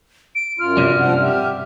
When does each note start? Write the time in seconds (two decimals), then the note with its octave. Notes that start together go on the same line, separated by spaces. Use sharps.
0.35 D7
0.59 F#2 F4 F6
0.77 G2 C3 G3
1.00 A#2 F3 F#5
1.22 G4 E5